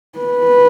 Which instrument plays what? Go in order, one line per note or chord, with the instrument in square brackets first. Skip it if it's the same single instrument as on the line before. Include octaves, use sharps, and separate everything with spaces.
[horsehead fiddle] B4